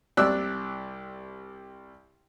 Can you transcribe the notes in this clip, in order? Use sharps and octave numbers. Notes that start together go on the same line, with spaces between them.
C2 C3 D5 E6 F#6